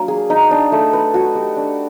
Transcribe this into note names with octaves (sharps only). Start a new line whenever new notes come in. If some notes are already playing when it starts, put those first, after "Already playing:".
Already playing: F#3 A#3 D4
G#4
D#4
D4
A3
B4
F#4
G4
D4